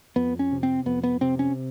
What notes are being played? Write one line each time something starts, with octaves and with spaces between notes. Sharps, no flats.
F2 B3
C#4
C3
C4
F2 B3
B3
C3 C4
C#4